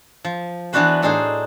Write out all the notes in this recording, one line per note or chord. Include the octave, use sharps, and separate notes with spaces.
F3
E3 B3 D4 F#4 B4 C5
A2 D4 D#4 G#4 C5